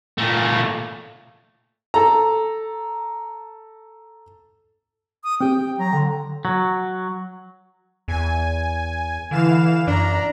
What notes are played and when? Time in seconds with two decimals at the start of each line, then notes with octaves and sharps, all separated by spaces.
0.18 A#2 A3
1.94 A4 A#5
5.24 D#6
5.40 C4 G4 G5
5.79 F#3 A#5
5.93 D3 G5 C6
6.45 F#3
8.08 E2 G#5
9.31 D3 E3 F5 E7
9.87 F#2 D4 A#5